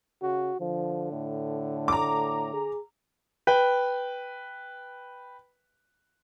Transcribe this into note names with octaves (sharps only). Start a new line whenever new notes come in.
C#3 F#4
D3 F3
A2
A#5 D6
G#4
B4 G5